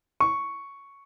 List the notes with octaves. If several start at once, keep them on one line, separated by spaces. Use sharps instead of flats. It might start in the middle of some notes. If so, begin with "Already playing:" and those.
C#6